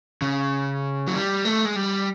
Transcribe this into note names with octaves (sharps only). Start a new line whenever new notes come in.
C#3
F#3
G3
A3
G#3
G3